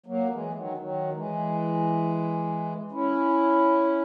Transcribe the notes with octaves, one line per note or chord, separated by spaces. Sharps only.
F#3 A#3
E3 G#3
D#3 F#3
D#3 F#3
E3 G#3
C#4 E4